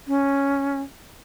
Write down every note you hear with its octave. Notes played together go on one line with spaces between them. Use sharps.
C#4